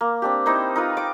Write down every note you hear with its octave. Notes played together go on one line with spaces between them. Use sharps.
A#3
C4 D4 G4
C4 D#4 E4 C5
D#4 F4 B4
G5 D6